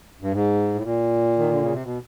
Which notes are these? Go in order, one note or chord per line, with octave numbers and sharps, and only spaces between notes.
G2
G#2
A2
A#2
D#3
D3
C#3
C3
B2